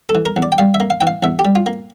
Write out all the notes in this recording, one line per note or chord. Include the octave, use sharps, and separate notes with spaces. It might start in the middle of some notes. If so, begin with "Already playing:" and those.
A4
E3
A#4
E2
D5
G5
G3 F5
E5
A#3
F5
E3 G5
F5
E2 E5
G4
G3
F4
A#3